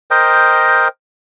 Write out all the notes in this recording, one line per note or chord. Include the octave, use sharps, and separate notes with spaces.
A#4 C5 D#5 G5